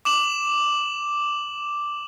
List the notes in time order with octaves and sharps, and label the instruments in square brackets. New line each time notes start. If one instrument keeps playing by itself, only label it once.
[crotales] D6 E7 F#7